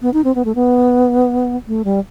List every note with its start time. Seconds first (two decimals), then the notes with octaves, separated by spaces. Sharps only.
0.02 B3
0.14 D#4
0.24 C4
0.35 B3
0.45 A3
0.55 B3
1.68 A3
1.85 G3